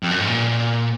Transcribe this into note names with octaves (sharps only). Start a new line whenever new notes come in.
F2
F#2
G#2
A#2